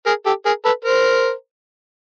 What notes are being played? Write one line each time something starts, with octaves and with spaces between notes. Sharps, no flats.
G#4 A#4
G4 A4
G#4 A#4
A4 B4
A#4 C5